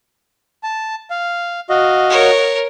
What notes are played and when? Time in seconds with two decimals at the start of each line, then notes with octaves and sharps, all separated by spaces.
0.63 A5
1.10 F5
1.70 F#4 D#5 F5
2.10 A#4 C#5